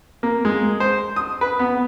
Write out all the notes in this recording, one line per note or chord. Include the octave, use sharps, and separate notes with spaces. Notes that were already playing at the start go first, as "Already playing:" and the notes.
A#3
G#3
C5
D#6
B4
B3